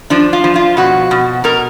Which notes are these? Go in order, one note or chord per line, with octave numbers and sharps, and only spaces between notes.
F3 D4
F4
F3
F4
B2 F#4
B2
B2 A#4